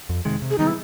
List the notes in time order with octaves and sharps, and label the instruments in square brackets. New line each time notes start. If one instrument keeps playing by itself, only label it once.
[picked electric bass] F2
C3 D#3 G#3
C3
[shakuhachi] G#4
[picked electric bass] D#3 G3 B3 [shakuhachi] D#4
[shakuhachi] E4